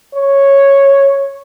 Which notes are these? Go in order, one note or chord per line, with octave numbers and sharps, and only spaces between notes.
C#5